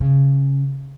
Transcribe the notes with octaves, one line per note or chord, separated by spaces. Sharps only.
C#3